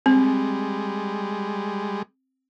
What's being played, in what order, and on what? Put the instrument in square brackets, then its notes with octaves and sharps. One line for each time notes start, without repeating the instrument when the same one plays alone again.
[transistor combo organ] G3 G#3 [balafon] C4